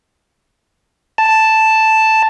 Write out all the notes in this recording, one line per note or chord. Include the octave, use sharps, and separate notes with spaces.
A5